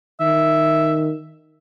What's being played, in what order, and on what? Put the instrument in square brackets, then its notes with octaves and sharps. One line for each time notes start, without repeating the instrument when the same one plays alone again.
[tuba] D#3 [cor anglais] E5